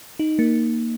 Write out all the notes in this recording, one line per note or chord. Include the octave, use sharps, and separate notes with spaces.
D#4
A#3